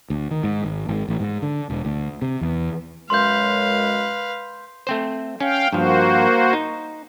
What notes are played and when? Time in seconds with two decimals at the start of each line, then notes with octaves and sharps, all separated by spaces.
0.10 D2
0.31 D#3
0.44 G#2
0.64 G#1
0.88 G#1
1.08 A1
1.20 G#2
1.42 D3
1.70 E1
1.85 D2
2.22 C3
2.41 E2
3.10 F#2 G#3 B4 F5 C6 G6
4.87 A3 C4 C5
5.40 C#4 F5 G5
5.73 G2 F3 A#3 F#4 C5
6.53 D#4